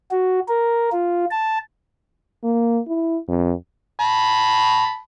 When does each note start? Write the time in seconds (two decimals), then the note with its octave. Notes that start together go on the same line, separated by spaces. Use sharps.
0.11 F#4
0.48 A#4
0.92 F4
1.31 A5
2.44 A#3
2.88 E4
3.28 F2
4.00 A5 B5